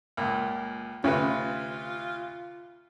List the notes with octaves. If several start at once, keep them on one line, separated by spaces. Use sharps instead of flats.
C#2 A#2
D2 C3 C#4 F4 B4